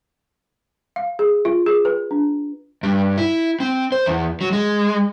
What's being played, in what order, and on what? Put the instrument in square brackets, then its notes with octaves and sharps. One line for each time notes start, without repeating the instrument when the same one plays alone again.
[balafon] F5
G#4
F4
G#4
B4
D4
[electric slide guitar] G2
E4
C4
C5
E2
F#3
G#3